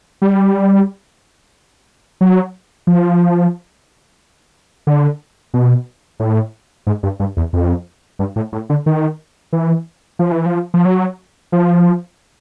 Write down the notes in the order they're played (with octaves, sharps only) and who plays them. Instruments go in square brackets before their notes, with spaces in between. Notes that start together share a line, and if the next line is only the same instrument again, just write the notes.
[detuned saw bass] G3
F#3
F3
D3
B2
A2
G#2
G2
G2
E2
F2
G2
A2
A2
D3
D#3
E3
F3
E3
F3
F3
F#3
F3